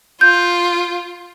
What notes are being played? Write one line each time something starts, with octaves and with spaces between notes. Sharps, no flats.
F4 G6